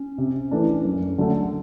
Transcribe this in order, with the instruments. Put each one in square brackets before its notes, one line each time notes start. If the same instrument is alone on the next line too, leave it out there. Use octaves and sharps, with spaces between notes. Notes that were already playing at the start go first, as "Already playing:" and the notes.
Already playing: [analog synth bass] C#4
[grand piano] C3
E3 A3 D4
F#2
D3 F#3 A3